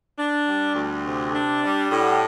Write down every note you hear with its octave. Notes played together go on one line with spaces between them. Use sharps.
D4
G3
D2
C3
D4
G3
A2 G5
F#5
G5